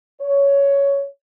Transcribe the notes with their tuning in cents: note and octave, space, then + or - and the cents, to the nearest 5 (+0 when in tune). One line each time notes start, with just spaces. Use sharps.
C#5 +10